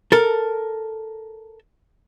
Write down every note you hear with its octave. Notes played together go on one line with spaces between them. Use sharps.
A4 A#4